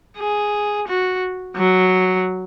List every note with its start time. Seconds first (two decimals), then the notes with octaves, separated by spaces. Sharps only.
0.17 G#4
0.87 F#4
1.56 F#3